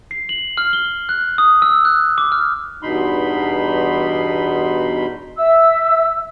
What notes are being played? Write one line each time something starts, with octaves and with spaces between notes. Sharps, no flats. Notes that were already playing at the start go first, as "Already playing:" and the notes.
C7
F#7
F6
G7
F#6
D#6
E6
F#6
D6
F6
E2 G2 B2 D#4 B5 C6
E5 E6